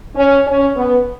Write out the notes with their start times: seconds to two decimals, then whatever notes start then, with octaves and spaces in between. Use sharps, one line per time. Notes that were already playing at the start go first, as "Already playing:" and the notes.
0.15 C#4
0.46 C#4
0.76 B3